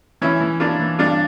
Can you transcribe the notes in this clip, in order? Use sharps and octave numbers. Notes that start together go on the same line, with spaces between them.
E3 C#4 E4
E3
A#3 D4 F4
E3
G2 D4 F4